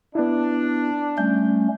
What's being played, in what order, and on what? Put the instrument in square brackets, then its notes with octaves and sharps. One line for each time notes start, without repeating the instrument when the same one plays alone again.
[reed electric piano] B3 E4 [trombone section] D4
[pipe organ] G3 A3 C#4 [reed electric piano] G6